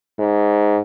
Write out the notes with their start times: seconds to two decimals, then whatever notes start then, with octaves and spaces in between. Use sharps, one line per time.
0.19 G#2